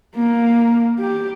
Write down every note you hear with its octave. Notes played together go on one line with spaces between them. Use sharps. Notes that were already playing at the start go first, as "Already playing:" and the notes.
A#3
G4